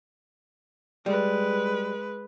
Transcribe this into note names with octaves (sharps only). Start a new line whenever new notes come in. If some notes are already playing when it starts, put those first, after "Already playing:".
G3 G#3 B4